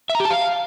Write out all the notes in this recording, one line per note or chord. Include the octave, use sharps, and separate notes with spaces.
E5
A#5
G4
A5
F5